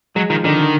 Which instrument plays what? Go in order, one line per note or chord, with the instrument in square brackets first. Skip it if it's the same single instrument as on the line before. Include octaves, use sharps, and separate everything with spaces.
[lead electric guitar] F#3 [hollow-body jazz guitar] G#3
[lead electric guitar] D#3 [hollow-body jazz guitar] F3
[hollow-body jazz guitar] D3 [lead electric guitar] D#3
[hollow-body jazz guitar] D3